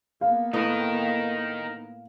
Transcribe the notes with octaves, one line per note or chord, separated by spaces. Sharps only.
A#3 B3 F5
A2 D#4 A#4 B4 D#5